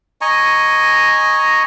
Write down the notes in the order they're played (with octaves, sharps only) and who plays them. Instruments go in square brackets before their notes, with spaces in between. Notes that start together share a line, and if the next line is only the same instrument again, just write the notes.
[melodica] D#5 G#5 A#5 C#6